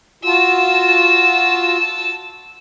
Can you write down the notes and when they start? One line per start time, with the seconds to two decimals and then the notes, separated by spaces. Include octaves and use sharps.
0.24 F4 F#4 A5 E6